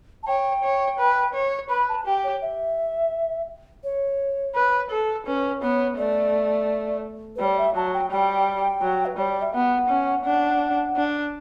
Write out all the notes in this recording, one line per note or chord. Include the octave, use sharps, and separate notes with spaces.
A5
C#5 G5
C#5
B4
C#5
B4 B5
A5
G4 G5
C#5
E5
C#5
B4
A4
C#4 B4
B3 C#5
A3 D5
B4
G3 C#5
D5
E5
F#3 A5
G5
G3 G5
F#3
B4
G3 C#5
D5
E5
B3 F#5
C#4
D4
D4